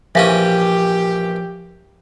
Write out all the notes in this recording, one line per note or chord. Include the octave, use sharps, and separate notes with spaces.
A#1 E3 F3 C#4 G4 E5 F5 G#5